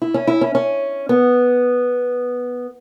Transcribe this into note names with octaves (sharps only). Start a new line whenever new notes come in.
E4
C#4
E4
C#4
C#4
B3